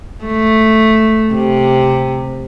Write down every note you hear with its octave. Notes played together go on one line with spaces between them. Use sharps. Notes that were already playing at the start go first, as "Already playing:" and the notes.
A3
C3